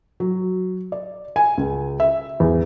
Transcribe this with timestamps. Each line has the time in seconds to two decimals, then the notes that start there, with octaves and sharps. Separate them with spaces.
0.20 F#3
0.92 D5
1.36 G#5
1.58 C#2
2.00 E5
2.40 E2